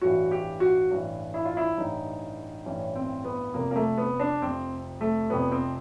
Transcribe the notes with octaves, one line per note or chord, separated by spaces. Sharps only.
A1 G2 E3 F#4
G4
F#4
A1 G2 E3
E4
F4
E4
A1 G2 E3 D#4
A1 G2 E3 C#4
C4
B3
F1 F2 C3 A#3
A#3
A3
B3
D4
F1 F2 C3 C4
A3
F1 F2 C3 B3
C4